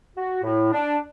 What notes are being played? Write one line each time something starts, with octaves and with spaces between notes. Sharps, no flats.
F#4
A2
D4